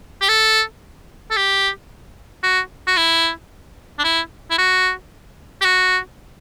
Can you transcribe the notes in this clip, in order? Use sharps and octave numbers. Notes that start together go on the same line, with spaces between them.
G4
A4
A4
G4
F#4
F#4
E4
D4
E4
E4
F#4
G4
F#4